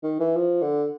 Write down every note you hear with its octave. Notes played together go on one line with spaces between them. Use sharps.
D#3
E3
F3
D3